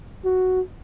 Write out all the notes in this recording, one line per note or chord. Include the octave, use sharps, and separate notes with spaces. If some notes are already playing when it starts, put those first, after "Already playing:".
F#4